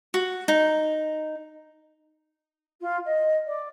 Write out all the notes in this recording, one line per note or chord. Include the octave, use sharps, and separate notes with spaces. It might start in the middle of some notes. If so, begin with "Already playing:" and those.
F#4
D#4
F4
D#5
D5